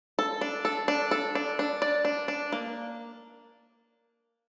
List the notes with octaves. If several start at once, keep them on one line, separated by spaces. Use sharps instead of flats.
A4
D4
A4
D4
A4
D4
D4
D5
D4
D4
A#3